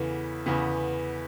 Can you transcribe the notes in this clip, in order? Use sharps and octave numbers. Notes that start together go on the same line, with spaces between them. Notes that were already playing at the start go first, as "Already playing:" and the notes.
Already playing: E2 C#3 E3 B3 A4
E2 C#3 E3 B3